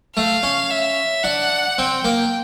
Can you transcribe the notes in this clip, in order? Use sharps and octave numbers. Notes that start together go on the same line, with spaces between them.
A3 F5
C#4
E5
D4 F#5
C4 G5
A#3